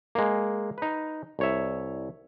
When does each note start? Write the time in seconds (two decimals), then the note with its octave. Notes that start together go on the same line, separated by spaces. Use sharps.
0.15 G#3 A#3
0.78 D#4 B4
1.39 C2 C#5 E5